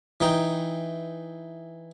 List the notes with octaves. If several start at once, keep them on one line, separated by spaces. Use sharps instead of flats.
E3 D#4 G5